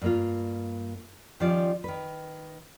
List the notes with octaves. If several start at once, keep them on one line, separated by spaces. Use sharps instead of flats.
G2 A#3 F4
D#3 F3 G3 C#4 F4 D5
D#3 B4